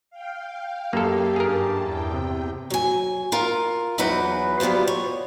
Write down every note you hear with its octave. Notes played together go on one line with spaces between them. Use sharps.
F5 G5
F#2 A#3 G4 A4
G2 G#4 A#4 A5
E2 G5
C3
F#3 G#5
F4 A#4
E2 E3 F#3 D#4 B4 F#5
F#3 G3 B3 F4 C5
C#5